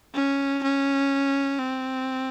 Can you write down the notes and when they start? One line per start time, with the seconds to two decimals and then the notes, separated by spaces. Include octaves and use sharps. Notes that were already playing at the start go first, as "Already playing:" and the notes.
0.15 C#4
0.63 C#4
1.59 C4